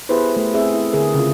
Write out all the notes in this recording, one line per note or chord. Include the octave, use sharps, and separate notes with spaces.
B3 E4 G4 G#4 B4 C5
A3
C4 E4 G#4 E5
E4
D3 G#4 A#4
C#3 F4